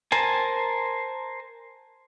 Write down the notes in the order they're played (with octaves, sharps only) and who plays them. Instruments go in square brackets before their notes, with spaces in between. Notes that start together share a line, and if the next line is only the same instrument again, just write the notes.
[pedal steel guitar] A#4 C5 G#5 A5